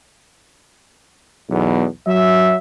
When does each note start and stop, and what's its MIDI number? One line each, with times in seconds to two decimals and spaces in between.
1.50 1.85 35
1.50 1.85 40
2.07 2.57 54
2.07 2.57 76